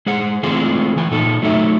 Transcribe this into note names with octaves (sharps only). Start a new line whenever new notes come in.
G#3 G#4 C5 F#5
E3 G#3 A3 C4 F4 G#4
E3 A3 G#5
A#2 D#4 A4
F#3 A3 D#4 A4 E5